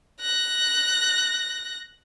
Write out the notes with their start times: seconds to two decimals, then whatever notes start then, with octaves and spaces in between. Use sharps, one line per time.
0.21 F#6 A#6